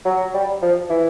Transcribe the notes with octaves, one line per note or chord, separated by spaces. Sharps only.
F#3
G3
F3
E3